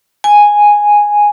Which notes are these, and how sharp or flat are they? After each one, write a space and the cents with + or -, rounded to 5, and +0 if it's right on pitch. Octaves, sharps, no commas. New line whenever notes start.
G#5 -5